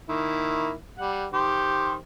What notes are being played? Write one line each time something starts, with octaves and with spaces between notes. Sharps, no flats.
D#3 A#3 E4
G3 F#5
D#3 G4 C5